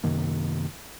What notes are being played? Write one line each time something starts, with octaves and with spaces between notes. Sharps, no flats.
F#2 C3 D#3 A#3